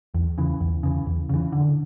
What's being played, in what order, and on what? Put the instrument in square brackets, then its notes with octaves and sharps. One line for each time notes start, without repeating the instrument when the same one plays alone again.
[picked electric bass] E2
C#3 E3
E2
C#3 E3
E2
C#3 E3
D3